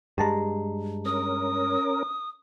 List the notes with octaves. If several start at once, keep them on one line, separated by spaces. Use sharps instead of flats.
G2 G#3 G4 A5 A#5
C#4 A#4 D#6